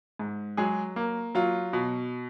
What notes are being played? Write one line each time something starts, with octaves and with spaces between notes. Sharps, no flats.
G#2
F#3 G#3 G#4
A#3
F#3 F4
B2